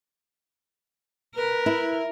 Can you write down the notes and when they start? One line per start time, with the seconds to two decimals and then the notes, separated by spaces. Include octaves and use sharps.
1.35 A#4 B4
1.66 E4